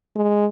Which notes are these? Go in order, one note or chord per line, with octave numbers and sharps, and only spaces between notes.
G#3